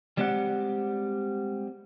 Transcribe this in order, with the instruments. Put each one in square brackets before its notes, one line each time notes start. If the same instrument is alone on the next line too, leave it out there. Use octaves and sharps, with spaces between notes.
[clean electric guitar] G3 G#3 C4 G4 D5 F#5